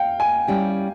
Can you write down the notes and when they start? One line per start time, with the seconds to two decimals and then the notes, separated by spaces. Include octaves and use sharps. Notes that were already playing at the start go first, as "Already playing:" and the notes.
Already playing: F5 G5
0.20 G#5
0.47 G3 C#4 E4 G4